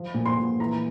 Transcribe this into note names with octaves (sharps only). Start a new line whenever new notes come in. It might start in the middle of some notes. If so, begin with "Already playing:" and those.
Already playing: F3
A#2
C6
A#2
E3 A#5